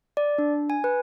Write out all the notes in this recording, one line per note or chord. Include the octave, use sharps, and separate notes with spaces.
D5
D4
G#5
B4